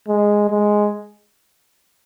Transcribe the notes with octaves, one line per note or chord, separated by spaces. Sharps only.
G#3
G#3